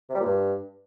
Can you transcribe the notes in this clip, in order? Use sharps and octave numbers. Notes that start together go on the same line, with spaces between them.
C3
G3
A#2
G2